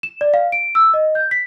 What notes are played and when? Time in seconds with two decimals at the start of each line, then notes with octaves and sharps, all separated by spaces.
0.03 E7
0.21 D5
0.34 F5
0.52 D7
0.75 E6
0.94 D#5
1.15 G6
1.31 B6